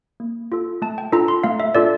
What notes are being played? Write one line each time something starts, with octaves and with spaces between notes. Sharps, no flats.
A#3
F4 A4
A3 A5
G5
D4 F4 A4 A#5
C6
A3 F5
E5
D4 F4 A4 D5